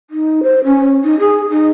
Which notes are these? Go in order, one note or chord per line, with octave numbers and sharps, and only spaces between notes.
D#4
C5
C#4
D#4
G#4
D#4